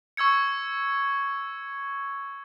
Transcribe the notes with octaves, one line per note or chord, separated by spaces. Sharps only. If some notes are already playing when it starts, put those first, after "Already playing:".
C#6 E6 G#6 C#7